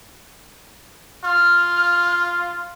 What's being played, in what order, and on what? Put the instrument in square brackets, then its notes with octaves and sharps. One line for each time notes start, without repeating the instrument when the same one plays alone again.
[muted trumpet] F4 [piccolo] F6